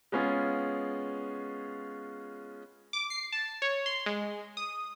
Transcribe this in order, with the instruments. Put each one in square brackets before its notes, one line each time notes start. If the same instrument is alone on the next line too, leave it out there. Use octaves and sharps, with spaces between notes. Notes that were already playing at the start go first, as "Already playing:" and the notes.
[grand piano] G#3 B3 C#4 F4 G#4
[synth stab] D6
C7
A5
C#5
C6
G#3
D#6